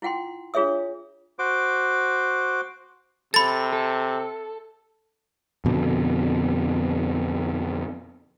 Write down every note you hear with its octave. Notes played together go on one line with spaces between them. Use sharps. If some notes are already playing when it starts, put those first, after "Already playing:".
E4 F4 F#5 G5 C6
D4 F4 G#4 C#5 E5 D#6
F#4 C5 D6
C3 A4 B5 A6
A4
F2 B2 D3